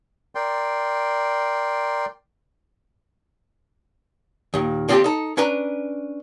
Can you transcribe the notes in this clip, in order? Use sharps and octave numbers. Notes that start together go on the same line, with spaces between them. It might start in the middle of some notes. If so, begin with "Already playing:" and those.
A#4 D5 G5 C6
D#2 A#2
D3 F3 C4 C#4 F4 G4
D#4 A4
C#4 D4 B4 A#5